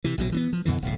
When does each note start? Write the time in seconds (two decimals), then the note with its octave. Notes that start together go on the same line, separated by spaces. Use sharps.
0.04 C3 E3
0.18 A#1 B2 F#3
0.32 E3 A#3 B3
0.53 F3
0.65 F2 B2 D3 E3
0.82 D1 B1 A2